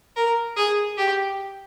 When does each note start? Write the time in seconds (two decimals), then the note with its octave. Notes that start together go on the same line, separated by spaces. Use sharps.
0.16 A#4
0.56 G#4
0.97 G4